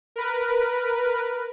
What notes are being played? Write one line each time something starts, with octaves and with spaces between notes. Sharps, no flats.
A#4 B4